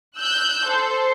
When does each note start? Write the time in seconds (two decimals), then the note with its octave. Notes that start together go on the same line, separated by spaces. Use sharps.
0.17 E6 F#6 G6
0.65 A4 C5